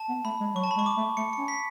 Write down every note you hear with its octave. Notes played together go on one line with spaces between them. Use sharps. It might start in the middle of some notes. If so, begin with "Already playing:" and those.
Already playing: A5
B3
A3 B5
G#3
F#3 C#6
A5
B5
G#3 C#6
D6
A3
A3 C#7
C#7
C#4
B6